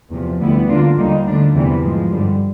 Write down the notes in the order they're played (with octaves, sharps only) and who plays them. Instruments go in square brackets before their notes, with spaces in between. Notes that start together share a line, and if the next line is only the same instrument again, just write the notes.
[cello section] E2 C3 F3
D2 D3 G3 B3 E4
D3 F3 A#3 D4 F4
D#2 D3 G3 A#3 D#4
D3 F3 A3 D4
E2 C3 E3 G3
G#2 F3 G#3
G2 D3 G3